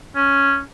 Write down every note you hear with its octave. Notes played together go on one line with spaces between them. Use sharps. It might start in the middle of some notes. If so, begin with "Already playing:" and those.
C#4